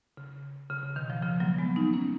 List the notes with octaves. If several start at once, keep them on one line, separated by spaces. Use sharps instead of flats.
C#3
C#3
C#3
B2 D#3
C#3 F3
C#3 F3
F#3 A#3
G#3 B3
B3 D#4
A#3 C#4